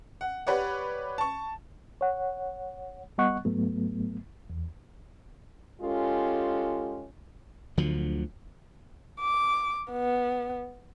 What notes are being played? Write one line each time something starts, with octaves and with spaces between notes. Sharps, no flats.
F#5
G4 B4 C#5 D5 F#5
A5 C#6
C#5 F#5
G3 B3 D#5 F#5 C#6 F#6
G#2 F#3 A3 B3
E2
G#3 C#4 F4 G4 A4
D2 D3 F3 F#3
D6
B3